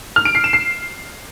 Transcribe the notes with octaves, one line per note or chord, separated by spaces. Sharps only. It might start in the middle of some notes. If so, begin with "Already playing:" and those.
F6
D7
C7
E7
C7